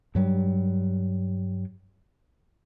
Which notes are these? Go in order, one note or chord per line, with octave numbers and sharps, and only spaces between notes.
G2 F#3 G3